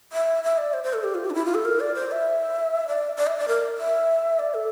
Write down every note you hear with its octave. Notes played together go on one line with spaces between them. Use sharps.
E5
E5
D5
C5
C5
A4
G4
F4
G4
D4
E4
F4
A4
A#4
D5
C5
E5
D5
D5
E5
D5
A#4
E5
D5
A4